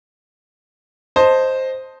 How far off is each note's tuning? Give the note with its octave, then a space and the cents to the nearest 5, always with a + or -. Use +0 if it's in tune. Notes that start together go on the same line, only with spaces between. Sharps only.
C5 +0 D#5 +0 A5 +5